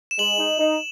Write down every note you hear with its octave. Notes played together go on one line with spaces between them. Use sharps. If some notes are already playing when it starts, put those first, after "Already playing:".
E7
G#3 F#7
D#4
D#4